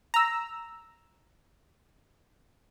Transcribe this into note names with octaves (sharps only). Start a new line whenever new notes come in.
A#5 E6